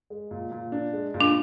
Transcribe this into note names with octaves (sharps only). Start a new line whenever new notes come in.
G#3
A#2
A#2
D4
G#3
A#2
D4